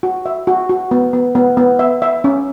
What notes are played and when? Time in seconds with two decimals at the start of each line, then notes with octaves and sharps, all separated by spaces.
0.03 F#4
0.26 E5
0.47 F#4
0.69 F#4
0.91 B3
1.13 B3
1.35 B3
1.57 B3
1.79 E5
2.02 E5
2.24 C#4